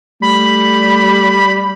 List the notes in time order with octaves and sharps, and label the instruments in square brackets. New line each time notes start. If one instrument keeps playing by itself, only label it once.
[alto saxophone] G3 [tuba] A3 [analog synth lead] B5